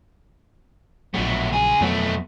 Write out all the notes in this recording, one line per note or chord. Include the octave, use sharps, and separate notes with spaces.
A#1 B2 F#3 A3
C#2 G#4
F2 B2 F#3 A3 B3